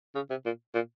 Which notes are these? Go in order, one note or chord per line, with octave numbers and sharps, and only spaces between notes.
C#3
C3
A#2
A#2